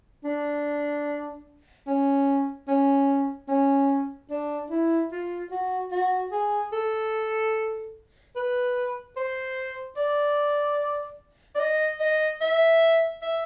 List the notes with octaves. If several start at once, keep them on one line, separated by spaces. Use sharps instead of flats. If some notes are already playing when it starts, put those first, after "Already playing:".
D4
C#4
C#4
C#4
D4
E4
F4
F#4
F#4
G#4
A4
B4
C5
D5
D5
D#5
D#5
E5
E5